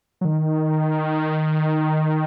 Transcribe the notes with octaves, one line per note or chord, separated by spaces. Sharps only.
F#3
D#3